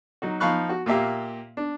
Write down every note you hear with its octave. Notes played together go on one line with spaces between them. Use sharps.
F#3 D#4 F#4
F3 D#4 F5 B5 C#6 F#6
F#4
A#2 A#3 G4 E5 F5
D4